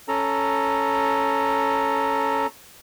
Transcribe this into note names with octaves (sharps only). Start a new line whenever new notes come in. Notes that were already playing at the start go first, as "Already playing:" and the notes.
C#4 A4 A#5